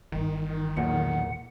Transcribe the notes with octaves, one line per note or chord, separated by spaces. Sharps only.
G1 D#3 E3
B1 E2 A#2 A#3 F#5